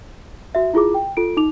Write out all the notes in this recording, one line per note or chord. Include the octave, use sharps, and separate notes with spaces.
F#4 E5
E4 F4 G#4 D6
G5
F4 A4 D7
D#4 D6 F7